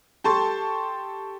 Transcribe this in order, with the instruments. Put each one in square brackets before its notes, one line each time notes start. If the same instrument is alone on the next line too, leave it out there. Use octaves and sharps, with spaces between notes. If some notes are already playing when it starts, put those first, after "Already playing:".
[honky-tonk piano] G4 A4 A5 C6 C#6